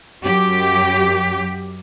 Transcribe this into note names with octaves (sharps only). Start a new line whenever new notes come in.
F#2 F#3 G4